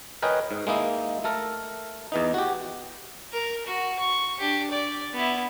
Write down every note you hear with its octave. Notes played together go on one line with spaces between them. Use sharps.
A#4 B4 C#5 D#5 G5 G#5
G#2
G#3 A#3 D#4 E4
A3 A4 A#4
E2 E3 D#4
F#4 G4
A#4
F#4
C#6
D4 G4
D5
B3 E4